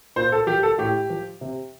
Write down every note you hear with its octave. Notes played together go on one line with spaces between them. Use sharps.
A#2 C5
A4
F3 G4
A4
A2 G4
F3
C3